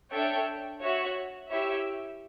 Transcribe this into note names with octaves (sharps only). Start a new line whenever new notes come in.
D4 A4 C#5 E5 G5
F#4 C#5 E5
E4 G4 C#5 E5